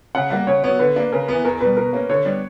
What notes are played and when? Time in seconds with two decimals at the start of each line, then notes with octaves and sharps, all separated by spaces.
0.15 C#3 F#5
0.30 G3 A#3 F#5
0.47 C#3 C#5
0.64 F#3 B3 C#5
0.79 D3 B4
0.96 A#3 D4
1.12 C#3 A#4
1.28 E3 B3 B4
1.45 E2 A#4
1.60 B2 G3 B4
1.77 B2 A#4
1.93 A#3 C#4
2.10 D3 C#5
2.25 G3 B3 D4